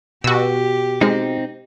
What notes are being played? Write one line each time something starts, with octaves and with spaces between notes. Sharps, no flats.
B2 F#4 G4 E6
G#3 C4 D#4